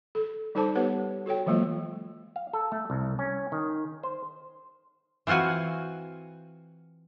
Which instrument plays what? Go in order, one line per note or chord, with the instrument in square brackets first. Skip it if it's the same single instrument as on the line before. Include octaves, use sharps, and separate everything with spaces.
[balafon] A4
G3 D#4 A4 C5 A5 D6
B3 G4 B4 C#5 F#5
F#4 A4 C#5 G5
E3 F#3 G#3 A#3 F4
[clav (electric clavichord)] F5
A4
A3
C2
C#4
D#3
C5
[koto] E3 C4 F4 F#4 G#5